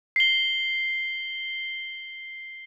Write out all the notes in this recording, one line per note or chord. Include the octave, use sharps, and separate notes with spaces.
C7 G7